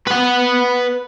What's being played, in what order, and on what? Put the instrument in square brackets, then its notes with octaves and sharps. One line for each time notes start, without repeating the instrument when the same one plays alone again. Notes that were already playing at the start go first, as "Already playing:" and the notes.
[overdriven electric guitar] B4 F#5